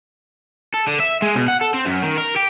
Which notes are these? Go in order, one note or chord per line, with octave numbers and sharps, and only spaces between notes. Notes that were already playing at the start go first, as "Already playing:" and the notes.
A4
D3
E5
G#3
B2
F#5
A4
C4
F#2
D#3
A#4
G4